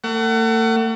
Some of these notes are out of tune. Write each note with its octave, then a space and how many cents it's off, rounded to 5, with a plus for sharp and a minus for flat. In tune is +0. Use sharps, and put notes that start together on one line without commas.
A3 +40 F#5 +30